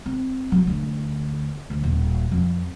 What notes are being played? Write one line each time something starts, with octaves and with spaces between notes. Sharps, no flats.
C4
F#3
D2
D2
D#1
F2